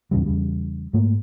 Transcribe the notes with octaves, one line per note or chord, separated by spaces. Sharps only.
E2 A#2 C#3 G3
E2 C#3 G3
G#2 A3 A#3